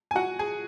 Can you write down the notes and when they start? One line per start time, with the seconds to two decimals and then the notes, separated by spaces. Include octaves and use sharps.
0.11 G#5
0.16 F#4 F#5
0.39 G#4 G#5